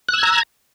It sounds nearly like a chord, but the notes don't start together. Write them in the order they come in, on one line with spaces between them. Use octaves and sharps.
F#6 E6 G#6 A#5